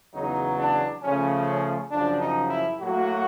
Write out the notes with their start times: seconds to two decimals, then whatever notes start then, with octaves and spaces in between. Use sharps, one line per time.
0.13 E2 C#3 F#3 B3 D#4
0.58 D4
1.02 C#3 F3 A3 C#4
1.47 C#4
1.91 F#2 C#3 F3 D4
2.21 D#4
2.50 E4
2.80 A2 F#3 A#3 F#4